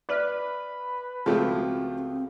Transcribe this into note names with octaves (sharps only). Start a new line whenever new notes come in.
B4 D5 E5 F6
C#2 F3 G#3 A3 C4 F#4 G4